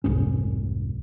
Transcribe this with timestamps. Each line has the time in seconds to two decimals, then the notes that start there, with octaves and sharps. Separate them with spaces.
0.04 F1 C2 G#2 C#4